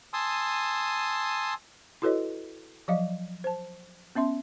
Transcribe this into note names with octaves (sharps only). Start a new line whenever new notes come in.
G#5 A5 C6 D#6 E6
E4 F#4 A4 B4 C#5 D#5
F3 F#3 D5 D#5 F5
C5 A5
B3 C#4 E5 C6